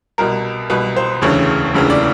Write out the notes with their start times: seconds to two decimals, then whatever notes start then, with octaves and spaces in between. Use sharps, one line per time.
0.18 C2 B2 A#4
0.70 C2 B2 B4
0.97 C5
1.21 E1 D2 C#3 E3 C#5
1.74 E1 D2 C#3 E3
1.90 D5